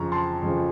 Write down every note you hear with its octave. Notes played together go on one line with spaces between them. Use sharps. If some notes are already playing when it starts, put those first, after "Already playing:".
Already playing: F2 C#3 F3 A#5 C#6
A5 C6
F2 C#3 F3